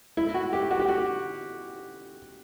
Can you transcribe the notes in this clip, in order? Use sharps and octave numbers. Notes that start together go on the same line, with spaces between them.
E4
F#4
G4
F#4
G4
F#4